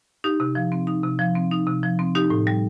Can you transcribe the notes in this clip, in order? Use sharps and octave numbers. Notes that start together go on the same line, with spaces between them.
D#4 G4
C3
F3
C4
D#4
C3
F3
C4
D#4
C3
F3
C4
D#4 G4
A2
G3